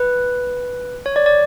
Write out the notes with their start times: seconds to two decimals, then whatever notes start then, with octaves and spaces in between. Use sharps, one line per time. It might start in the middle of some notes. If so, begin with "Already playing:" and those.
Already playing: B4
1.06 C#5
1.16 D5
1.26 D5